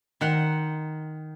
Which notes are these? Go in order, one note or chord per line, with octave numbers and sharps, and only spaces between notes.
D#3 F#5 C6